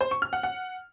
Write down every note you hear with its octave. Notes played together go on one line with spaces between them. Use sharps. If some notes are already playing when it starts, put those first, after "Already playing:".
C5
C#6
F6
F#5
F#5